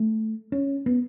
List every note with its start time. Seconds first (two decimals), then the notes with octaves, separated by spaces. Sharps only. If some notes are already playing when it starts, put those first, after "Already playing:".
Already playing: A3
0.52 C#4
0.86 B3